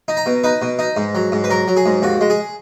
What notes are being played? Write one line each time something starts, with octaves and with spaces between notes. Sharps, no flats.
D#4
A#5
B2
D#4 B4
B2
D#4
G#2
F#3
G#2
B4
F#3 A#4
F#3
G#4
G#2
D#2 F#4
G#3
G#4